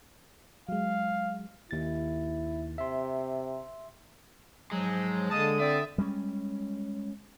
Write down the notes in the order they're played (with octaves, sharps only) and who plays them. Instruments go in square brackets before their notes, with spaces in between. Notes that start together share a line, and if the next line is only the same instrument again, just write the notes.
[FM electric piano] F#3 G#3 [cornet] F5
[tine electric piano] D#2 A6 [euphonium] E4
[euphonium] C3 [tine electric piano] E5 C6
[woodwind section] G#2 F3 F#3 [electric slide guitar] G#3
[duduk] D3 [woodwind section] A#3 D#5 A5 [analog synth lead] D#6
[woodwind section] C4 D5 [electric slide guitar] E5
[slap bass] G3 G#3 C4 C#4